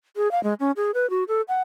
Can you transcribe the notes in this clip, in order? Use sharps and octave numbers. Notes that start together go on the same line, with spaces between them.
G#4
F5
G#3
C#4
G#4
B4
F#4
A4
F#5